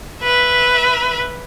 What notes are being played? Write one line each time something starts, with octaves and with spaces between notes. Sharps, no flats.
B4 E5